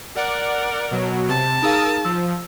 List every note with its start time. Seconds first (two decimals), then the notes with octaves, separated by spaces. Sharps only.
0.16 A#4 D5 F#5
0.91 B2 F#3
1.29 C3 A5
1.62 D#4 G#4 A#4 F5 D#6 E6
2.05 F3 E6